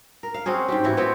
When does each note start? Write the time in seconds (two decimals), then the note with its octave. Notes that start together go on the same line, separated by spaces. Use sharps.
0.23 A#4
0.34 F5
0.46 C4 C#4 F#4 G#4
0.68 G#2 G4
0.84 A2 E3 E4 F#4
0.97 B3 C4 F#4 G4